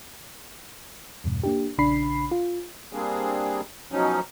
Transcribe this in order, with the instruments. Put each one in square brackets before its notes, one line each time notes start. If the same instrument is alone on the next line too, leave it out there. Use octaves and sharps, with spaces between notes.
[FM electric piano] E2 G2 B2
A#3 D4 G4
A#1 C#3 D4 B5 C7
F4
[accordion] G3 A#3 C4 D4 G#4
B2 F3 F#3 C#4 D#4